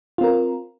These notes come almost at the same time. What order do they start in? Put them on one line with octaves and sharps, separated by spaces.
F4 C4 A#4